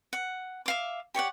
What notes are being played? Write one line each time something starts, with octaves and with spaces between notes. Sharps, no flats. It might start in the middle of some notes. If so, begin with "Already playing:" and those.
F#5
E5 F5 D6
G4 C#5 D5 F#5